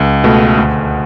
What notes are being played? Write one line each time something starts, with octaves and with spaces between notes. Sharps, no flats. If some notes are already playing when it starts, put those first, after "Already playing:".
Already playing: C#2
B2 A3
D2